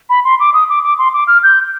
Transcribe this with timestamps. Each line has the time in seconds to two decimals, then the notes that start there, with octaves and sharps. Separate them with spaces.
0.10 B5
0.25 C6
0.40 D6
0.54 D#6
0.69 D6
0.83 D6
0.98 C6
1.14 D6
1.28 F6
1.43 G6